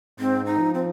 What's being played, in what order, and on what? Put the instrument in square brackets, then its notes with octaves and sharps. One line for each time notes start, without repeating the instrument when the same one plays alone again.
[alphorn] G#2 [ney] C4
[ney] D#4
[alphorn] F3
[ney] C4